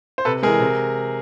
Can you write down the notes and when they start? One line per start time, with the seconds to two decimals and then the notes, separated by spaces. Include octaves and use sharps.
0.18 C5
0.25 C3 A4 B4
0.43 E3 G#3 G#4 A#4
0.60 C3